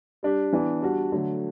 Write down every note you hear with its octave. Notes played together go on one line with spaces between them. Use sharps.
G3 D4 G4
E3 B3 D4
G3 D4 F#4
D3 F#3 A3